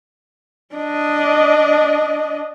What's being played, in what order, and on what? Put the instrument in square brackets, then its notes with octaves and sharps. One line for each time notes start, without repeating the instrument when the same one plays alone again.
[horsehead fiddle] D4 D#5